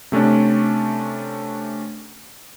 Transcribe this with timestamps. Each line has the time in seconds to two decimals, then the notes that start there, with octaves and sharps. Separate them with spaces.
0.12 C3 A3 C#4 D4